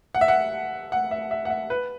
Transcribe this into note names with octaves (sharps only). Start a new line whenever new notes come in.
F#5
E5
F#5
F#5
E5
E5
F#5
E5
B4